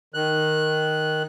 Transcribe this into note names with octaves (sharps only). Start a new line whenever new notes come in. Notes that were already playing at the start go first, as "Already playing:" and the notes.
D#3 F#6